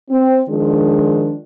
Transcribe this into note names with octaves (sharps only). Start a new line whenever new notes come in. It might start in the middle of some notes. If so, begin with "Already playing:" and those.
C4
D#3 F3 G#3 D4